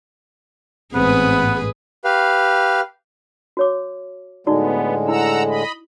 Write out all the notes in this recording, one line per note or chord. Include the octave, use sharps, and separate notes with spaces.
A1 G#2 B3 C4 G#4 B4
G4 B4 F5
F#4 C#5 D6
A2 D3 G#3 B3 D#4 F#4 D5
E4 F#5 A#5 E6
D#5 B5